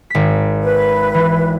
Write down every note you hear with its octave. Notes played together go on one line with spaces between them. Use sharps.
G#1 B6
B4
E3